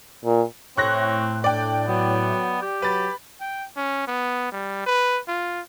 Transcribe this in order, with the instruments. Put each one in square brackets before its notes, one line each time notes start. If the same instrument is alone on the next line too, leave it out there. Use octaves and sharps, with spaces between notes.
[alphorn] A#2
[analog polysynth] A2 [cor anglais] C4 [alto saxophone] C#5 [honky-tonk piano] C#6 F#6 A#6
[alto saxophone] D4 [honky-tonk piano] D5 G5
[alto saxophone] F#3 [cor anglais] B3
[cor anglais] G4
[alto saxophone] F#3 [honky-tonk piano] B4 A6
[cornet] G5
C#4
B3
G3
B4
F4